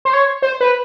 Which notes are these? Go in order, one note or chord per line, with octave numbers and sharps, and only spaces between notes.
C5
C#5
C5
B4